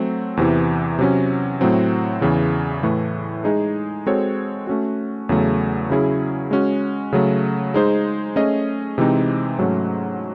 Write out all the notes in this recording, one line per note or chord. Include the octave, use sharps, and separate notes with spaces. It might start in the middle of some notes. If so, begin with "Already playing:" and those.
Already playing: F#3 A3 C4
E2 C3 E3
C3 F#3 C#4
A2 F#3 C4
E2 C#3 E3
A2 E3 A3
G#3 D#4 G#4
G#3 C4 F#4 A4 C#5
A3 C#4 F#4
E2 C#3 F#3 A3
C#3 F#3 C#4 E4 G#4
G#3 C#4 F#4
C#3 F#3 A3
G#3 D#4 G#4 C5
A3 C#4 G#4 D#5
C3 E3 G#3 C4 D#4
G#2 F#3 A3 C#4